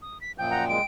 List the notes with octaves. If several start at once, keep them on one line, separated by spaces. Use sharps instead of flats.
D#6
B6
F#2 A#2 F3 G5 G6
F#5 A#5
G#3 D7